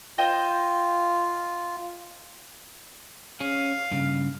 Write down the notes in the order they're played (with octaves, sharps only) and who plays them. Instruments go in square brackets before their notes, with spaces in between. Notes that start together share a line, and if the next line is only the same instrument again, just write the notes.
[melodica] F4 [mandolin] C5 D#5 G5
[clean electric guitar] C#4 G#4 [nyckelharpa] F5
[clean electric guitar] G2 C#3